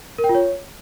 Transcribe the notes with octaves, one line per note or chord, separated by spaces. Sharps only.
A#4
G5
F4
C#5